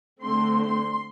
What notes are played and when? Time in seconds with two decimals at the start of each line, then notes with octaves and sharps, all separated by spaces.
0.23 D3 A3 C4 C6
0.62 C6